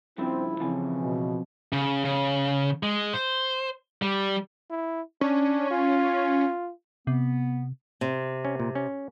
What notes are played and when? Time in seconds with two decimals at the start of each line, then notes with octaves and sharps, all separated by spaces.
0.18 G2 C#3 F3 C4 E4
0.60 C#3 E3 F3 C4 G#5
0.95 B2
1.73 C#3
2.05 C#3
2.83 G#3
3.13 C5
4.02 G3
4.70 E4
5.21 C#4 D4
5.71 F4
7.07 C3 B3
8.01 C3
8.45 C#4
8.60 A#2
8.75 C#4